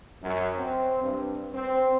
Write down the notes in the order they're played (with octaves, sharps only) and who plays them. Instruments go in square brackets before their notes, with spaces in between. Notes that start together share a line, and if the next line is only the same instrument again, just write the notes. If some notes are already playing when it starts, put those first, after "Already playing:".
[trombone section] F#2
C4
G2
C4